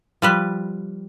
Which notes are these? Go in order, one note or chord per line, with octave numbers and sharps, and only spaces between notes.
F3 G3 B4